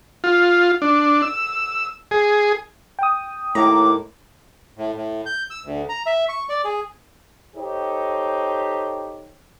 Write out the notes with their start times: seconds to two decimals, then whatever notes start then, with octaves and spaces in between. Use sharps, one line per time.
0.24 F4
0.82 D4
1.22 E6
2.11 G#4
2.99 G5 D#6
3.55 D#2 A2 A#5 D6
4.78 A2
4.96 A2
5.26 G6
5.50 E6
5.65 D2
5.89 A#5
6.06 E5
6.29 C#6
6.49 D5
6.65 G#4
7.56 D#4 G4 A4 C5 C#5